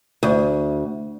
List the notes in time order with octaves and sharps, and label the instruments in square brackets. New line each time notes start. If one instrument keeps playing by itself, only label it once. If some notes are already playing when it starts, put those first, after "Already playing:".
[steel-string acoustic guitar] D2